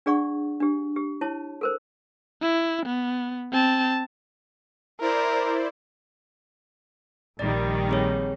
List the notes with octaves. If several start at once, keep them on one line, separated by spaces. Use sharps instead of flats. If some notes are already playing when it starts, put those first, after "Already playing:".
D4 G#4 D5 F#5 C#6
D4 G4
G4
E4 C#5 A5
A4 A#4 C5
E4
B3
C4 A5
E4 A#4 C5 D5
A#1 D#3 G3 D5 A6
C4 G#4 C#5